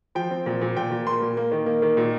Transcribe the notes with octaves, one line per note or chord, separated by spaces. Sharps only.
F3 G5
C4
A#2
A#2
A#2 G5
A#2
A#3 C6
A#2
A#3
D#3
A#3
D#3
A#2